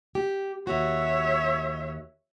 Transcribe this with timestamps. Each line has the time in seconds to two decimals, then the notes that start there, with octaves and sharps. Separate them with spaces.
0.15 G4
0.67 D#2 G#2 F#4 C#5 E5